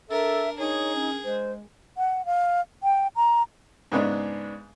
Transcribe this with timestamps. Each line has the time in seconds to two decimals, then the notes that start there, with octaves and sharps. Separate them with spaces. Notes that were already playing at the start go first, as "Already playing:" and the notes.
0.10 D4 A4 A#4 E5
0.59 D#4 G#4 C#5
0.95 C#4
1.25 G#3 C5
1.98 F#5
2.26 F5
2.83 G5
3.16 A#5
3.92 G#2 C#3 G#3 B3 D4